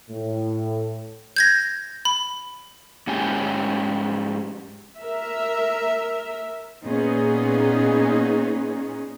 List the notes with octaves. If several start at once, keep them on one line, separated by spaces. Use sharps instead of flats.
A2
G6 G#6 A#6
B5
G#2 C#4 G4 G#5
A#4 E5
A#2 B3 C#4 D#4 G#4